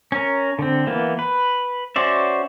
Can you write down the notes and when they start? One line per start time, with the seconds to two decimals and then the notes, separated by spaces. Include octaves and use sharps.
0.12 C#4 A#4
0.59 D3 C4
0.87 E3 A#3 B3
1.19 B4
1.96 C#4 F#4 C5 D5 E5